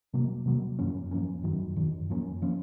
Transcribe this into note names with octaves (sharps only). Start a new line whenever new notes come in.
C3 F#3 A#3
C3 F#3 A#3
F#2 F3 A#3 C#4
F#2 F3 A#3 C#4
F#2 D#3 F#3
F#2 D#3 F#3
F#2 F3 A#3 C#4
F3 A#3 C#4